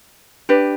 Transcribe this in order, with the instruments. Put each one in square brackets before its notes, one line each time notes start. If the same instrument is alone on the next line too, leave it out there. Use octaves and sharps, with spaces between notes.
[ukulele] D4 G4 B4